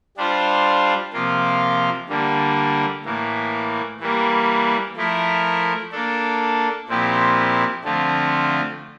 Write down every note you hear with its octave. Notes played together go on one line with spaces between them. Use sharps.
G3 D4 F4 C5
C3 F3 A#3 F4
D3 G3 A#3
A2 E3 A#3
E3 G3 A#3
F3 A3 E4 A#4
A#3 D4 A4
A#2 F3 C4 E4 G4
D3 F3 A3 C4 F4